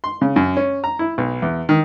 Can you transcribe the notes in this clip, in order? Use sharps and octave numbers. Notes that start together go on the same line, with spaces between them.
C6
C#3
F#2
C#4
A#5
E4
B1
E2
D#3